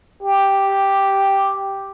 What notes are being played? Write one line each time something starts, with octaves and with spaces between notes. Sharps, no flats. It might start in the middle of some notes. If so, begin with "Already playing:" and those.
G4